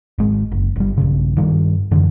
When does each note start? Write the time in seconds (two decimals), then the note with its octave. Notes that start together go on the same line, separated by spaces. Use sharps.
0.18 G#1 G#3
0.51 F#1
0.76 G1 G3
0.98 A#1 G2 C#3
1.37 G2 D#3 G3
1.91 F#2 D3 E3